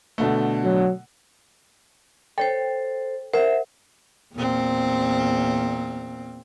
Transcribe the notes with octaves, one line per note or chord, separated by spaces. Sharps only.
B2 D3 A3
F#3
A4 C5 C#5 G5
A#4 C5 E5 F#5
E2 A#2 C4